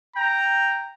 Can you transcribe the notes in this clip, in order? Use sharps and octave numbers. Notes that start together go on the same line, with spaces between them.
G5 A#5